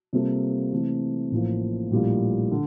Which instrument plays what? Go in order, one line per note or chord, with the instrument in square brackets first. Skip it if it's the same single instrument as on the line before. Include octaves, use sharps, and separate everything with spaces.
[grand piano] C3 G3 A#3 F4 A4
C3 E3 A3
A1 A2 F3 A#3
A#1 A2 G3 A#3 F4
D3